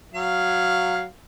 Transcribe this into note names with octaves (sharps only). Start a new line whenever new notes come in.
F#3 F5